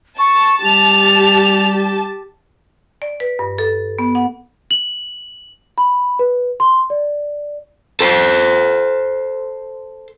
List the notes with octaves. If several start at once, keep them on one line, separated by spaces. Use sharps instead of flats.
A5 C#6
G3 G4 F7
D5
B4
G2
A4
B3
F#5
F#7
B5
B4
C6
D5
A4 C5